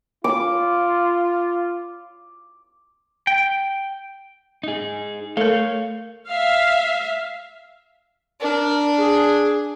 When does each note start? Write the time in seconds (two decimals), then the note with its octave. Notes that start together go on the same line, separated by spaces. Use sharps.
0.24 F4 D6
3.27 G5
4.63 D#4 G#4
5.37 A3 A4 A#4 C#5 F5
6.27 E5 F5
8.41 D4 A#4
8.97 G#4